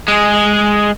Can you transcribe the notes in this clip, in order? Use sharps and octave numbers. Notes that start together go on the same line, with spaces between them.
G#3 G#4